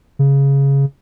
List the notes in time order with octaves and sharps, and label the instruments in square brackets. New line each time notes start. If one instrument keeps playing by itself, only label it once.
[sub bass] C#3